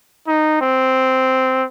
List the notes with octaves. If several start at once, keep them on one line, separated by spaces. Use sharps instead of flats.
D#4
C4